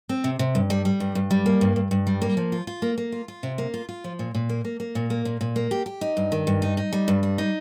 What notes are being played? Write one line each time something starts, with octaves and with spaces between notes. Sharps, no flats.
C4
C3
C3
G2
G3
G3
G2
G2
G3
A#3
G2
G2
G2
G3
A#3
F3
F4
F4
A#3
A#3
F4
F4
C3
A#3
F4
F4
F3
A#2
A#2
A#3
A#3
A#3
A#2
A#3
A#2
A#2
A#3
G4
G4
D#4
G2
D#3
G2
D#4
D#4
G3
G2
G3
D#4